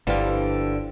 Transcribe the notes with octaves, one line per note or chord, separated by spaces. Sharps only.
G1 D3 E3 F3 G3 F4